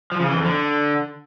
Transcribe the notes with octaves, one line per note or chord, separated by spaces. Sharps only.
F3
C#3
E3
F2
D3